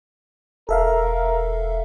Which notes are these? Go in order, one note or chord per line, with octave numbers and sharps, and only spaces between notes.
E1 A4 A#4 E5 F5